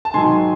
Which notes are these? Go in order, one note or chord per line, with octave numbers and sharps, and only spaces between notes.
A5
G#2 D#3 F#3 G#5 C6